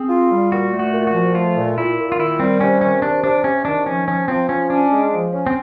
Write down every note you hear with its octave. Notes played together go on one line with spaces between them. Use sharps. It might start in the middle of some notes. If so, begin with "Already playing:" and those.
Already playing: C4 G#4
F4
G3
A#2 F#4
A3
F#4
A#2
F#4
F3
A3 F4
A#2
A#2 E4
A#2
F4
D#3 E4
G3 C4
C3 C#4
D#3 C#4
C3 D4
C3 D4
C3 C#4
D#3 D4
F3 C#4
F3 C#4
F3 C4
F3 C#4
C#4 D4
G#3
F3
C#4
C4